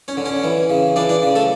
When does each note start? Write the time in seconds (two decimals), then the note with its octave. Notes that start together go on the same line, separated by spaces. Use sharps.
0.08 C#4 C#5
0.17 D3
0.26 C#4 C#5
0.44 E3
0.70 C#3
0.96 E3 D4 D5
1.09 D4 D5
1.23 C#3
1.36 A3 A4